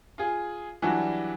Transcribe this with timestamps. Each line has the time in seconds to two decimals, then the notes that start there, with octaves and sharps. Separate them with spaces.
0.18 F4 G#4
0.82 E3 F#3 G3 D4 F#4